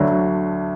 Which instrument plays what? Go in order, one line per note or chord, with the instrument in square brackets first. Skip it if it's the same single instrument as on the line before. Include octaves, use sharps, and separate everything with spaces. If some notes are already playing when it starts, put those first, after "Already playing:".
Already playing: [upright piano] D2 D3 F#3